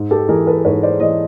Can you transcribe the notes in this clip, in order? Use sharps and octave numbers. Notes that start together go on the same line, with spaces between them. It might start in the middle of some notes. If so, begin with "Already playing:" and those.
Already playing: G#2
G4 A4
E3 G#4 A#4
A4 B4
G#2 B4 C#5
C5 D5
E3 C#5 D#5